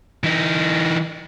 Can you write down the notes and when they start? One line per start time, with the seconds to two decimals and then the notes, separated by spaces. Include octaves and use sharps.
0.24 E3 D#4